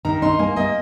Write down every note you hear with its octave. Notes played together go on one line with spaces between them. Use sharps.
D#3 A#5
D#4 C6
A#3 G#5
A#3 D#5